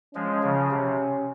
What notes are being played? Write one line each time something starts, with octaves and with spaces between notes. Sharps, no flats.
F3 G#3 C#4
C#3 F3
C3